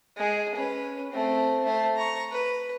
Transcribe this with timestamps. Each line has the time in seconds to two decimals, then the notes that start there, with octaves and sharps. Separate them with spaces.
0.17 G#3 G#4
0.55 C#4 B4
1.11 A3 C4
1.64 A3 C5
1.97 A#5 C#6
2.31 B4